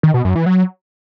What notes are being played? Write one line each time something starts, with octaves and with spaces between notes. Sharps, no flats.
D#3
B2
F#2
E3
F#3